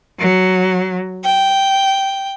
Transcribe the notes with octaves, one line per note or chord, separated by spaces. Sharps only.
F#3
G5